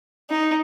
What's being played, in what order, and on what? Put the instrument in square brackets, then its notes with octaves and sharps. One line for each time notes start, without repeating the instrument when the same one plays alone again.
[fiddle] D#4